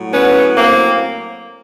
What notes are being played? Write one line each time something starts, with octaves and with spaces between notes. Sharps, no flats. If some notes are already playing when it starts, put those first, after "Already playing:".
Already playing: A2 F#3
B3 C#4
A#3 C4